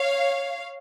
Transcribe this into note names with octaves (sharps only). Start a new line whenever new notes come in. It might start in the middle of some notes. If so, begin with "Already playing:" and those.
Already playing: C#5 F5